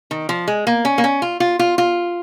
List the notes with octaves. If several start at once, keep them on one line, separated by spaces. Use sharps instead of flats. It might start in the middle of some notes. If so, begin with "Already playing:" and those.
D#3
F3
G#3
A#3
C#4
A#3
C#4
F4
F4
F4
F4